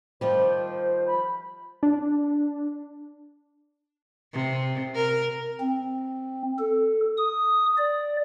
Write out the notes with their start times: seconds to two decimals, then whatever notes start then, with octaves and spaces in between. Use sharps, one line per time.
0.21 D#3 F3 G3 C5
1.07 B5
1.83 D4
4.34 C3
4.95 A#4
5.61 C4
6.59 A4
7.17 D#6
7.78 D5